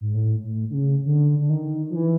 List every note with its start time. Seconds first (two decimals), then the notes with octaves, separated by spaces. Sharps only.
0.01 G#2
0.14 A2
0.44 A2
0.70 D3
0.74 C#3
1.05 D3
1.39 D3
1.50 D#3
1.90 F3
1.96 E3